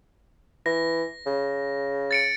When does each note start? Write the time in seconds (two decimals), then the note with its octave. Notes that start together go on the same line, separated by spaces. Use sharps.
0.66 E3 A#6
1.27 C#3
2.11 A6 C#7 D7